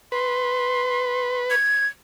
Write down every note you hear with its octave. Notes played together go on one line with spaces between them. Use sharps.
B4 C6
G#6